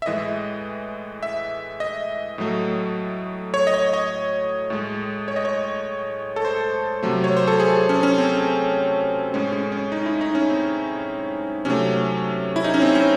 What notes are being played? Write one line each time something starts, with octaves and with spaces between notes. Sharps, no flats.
E5
A2 E3 G#3 D#5
E5
D#5
A2 F#3 A3
C#5
D#5
C#5
D#5
A2 G#3
C#5
D#5
C#5
A4
C5
C3 F#3 A3
C#5
C5
A4
G#4
C#4
C#4
C4
A2 G#3 C#4
C#4
C#4
D#4
E4
D#4
C#4
C4
C3 F#3 A3 C#4
E4
D#4
C#4
C4
C#4